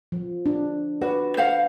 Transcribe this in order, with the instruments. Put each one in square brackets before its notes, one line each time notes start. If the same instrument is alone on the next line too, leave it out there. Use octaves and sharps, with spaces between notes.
[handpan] F3
D4
[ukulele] F#4 [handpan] B4 D5
[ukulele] C5 F5 F#5